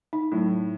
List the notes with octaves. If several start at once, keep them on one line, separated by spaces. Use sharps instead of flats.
D#4
A2 F#3
D#4